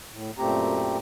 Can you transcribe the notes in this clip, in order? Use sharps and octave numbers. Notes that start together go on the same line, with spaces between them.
A2
F#2 A#2 A3 C4 G4 A#5